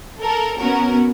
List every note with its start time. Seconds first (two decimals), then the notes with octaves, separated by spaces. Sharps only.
0.21 A4 A#4
0.59 B3 C#4 F#4 A#4